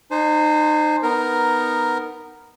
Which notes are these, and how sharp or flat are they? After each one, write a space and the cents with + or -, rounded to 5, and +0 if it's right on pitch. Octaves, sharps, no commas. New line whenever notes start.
D#4 -30 C5 +0 G#5 +30
B3 +0 D#4 +0 A#4 +0